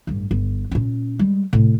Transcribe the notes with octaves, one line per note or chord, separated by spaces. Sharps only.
A1 G2
G1
A#2 C#4
G3 G#3
A2 C3